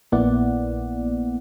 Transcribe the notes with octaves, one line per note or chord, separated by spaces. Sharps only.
A#1 A#3 B3 E4 D5 F#5